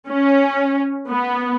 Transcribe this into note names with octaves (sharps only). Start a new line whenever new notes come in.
C#4
B3